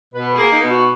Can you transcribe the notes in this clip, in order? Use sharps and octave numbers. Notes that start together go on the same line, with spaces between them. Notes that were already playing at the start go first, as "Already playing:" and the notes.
B2 B4
G#4
A#3
D#4
B2
F#4